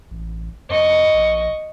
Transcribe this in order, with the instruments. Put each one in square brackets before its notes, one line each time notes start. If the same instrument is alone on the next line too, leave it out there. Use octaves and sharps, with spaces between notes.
[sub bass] A1
[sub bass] F2 [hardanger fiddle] D#5 C#6
[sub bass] A#1